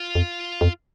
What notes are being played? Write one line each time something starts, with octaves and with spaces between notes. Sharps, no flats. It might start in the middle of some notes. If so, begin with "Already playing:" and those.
Already playing: F4
F2
F2